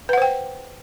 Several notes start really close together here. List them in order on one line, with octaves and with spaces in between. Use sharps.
B4 F#5 C5 G5